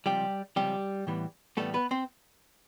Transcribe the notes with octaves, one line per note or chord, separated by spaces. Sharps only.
C#2 C3 F3 G3 G4
C#2 C3 F3 G3 G4
A2 E3 G3 B3
A2 E3 G3 A3 B3 A4
B3 B4
C4 C5